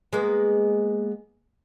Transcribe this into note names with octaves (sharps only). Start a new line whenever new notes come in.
G#3 A#3 B3